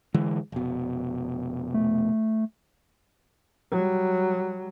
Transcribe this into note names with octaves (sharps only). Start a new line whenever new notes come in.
D3 E3 G#3
F1 B2
A3
F#3 G3